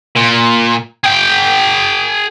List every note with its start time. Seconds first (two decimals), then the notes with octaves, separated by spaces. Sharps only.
0.16 A#2
1.04 G#4 G5